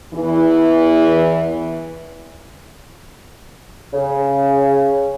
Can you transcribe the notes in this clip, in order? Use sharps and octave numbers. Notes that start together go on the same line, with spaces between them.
E2 E3
C#3